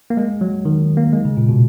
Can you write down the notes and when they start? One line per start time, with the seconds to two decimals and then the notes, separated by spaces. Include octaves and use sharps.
0.10 A#3
0.17 G#3
0.41 F#3
0.65 D#3
0.97 A#3
1.13 G#3
1.25 C#3
1.37 A#2
1.49 B2